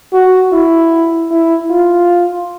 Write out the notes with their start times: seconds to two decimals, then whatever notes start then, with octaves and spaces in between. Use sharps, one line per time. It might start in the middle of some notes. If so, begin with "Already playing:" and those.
0.13 F#4
0.52 E4
1.31 E4
1.70 F4